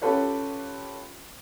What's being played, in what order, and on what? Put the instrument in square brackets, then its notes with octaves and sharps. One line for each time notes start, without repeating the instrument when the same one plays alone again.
[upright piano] C#4 F4 G4 A4 B4 C#5